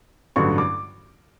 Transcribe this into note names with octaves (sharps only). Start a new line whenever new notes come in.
A1 G2 D3 F#3 C#6
D6